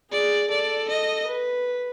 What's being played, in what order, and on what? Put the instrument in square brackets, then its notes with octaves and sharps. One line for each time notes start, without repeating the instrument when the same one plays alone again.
[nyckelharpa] G#4 [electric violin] D5
[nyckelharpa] A4 [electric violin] D5
[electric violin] D#5
[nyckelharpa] B4